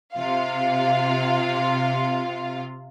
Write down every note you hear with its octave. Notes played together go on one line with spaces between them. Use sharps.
C3 F4 F5